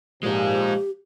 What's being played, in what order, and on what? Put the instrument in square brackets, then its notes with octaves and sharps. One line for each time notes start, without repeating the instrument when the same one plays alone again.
[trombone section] A#2 F3 [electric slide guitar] G#3 D#4 [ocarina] G4